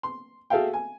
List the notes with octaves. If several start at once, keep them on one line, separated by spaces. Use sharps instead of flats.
C6
F#4 G#4 A4 E5 F5 G5
G#5